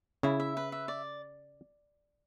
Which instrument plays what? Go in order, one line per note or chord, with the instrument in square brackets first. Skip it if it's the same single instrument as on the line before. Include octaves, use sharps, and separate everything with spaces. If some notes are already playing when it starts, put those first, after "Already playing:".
[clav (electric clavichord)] C#3 [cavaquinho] E4
[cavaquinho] E5
B4
E5
D5